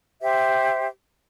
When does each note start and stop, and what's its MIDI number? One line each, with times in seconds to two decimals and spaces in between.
0.21 0.87 67
0.21 0.87 72
0.21 0.87 76